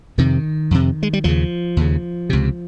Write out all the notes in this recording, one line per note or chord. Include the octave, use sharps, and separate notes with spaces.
F2 C3 D#3
F2 C3
G#3
G3
D#2 C#3 F3
D#2 C#3
C#2 C3